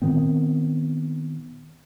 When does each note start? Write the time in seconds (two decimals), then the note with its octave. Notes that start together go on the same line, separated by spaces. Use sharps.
0.02 A#2 D#3 B3 C4